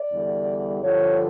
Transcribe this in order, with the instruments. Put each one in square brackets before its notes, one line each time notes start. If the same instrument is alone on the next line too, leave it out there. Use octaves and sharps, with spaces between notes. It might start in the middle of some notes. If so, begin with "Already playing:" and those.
Already playing: [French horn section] D5
E2 D3 G3
G2 D3 F3 C#5